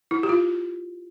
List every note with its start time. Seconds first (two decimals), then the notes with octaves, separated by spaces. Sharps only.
0.11 E4
0.23 G4
0.29 F4